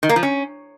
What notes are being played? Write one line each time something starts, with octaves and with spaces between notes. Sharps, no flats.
D#3
A#3
F3
C#4